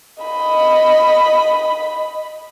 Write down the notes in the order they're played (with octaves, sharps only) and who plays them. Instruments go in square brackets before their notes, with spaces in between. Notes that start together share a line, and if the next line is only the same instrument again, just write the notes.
[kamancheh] D#5 B5